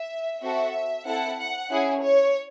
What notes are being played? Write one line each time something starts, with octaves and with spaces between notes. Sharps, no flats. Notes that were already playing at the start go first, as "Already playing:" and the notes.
Already playing: E5
C4 F#4 A4 E5
C4 E4 A4 F#5
F#5
C#4 E4 G#4
C#5